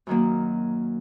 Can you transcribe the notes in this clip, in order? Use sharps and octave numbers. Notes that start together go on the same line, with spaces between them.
F#2 D#3 F#3 A#3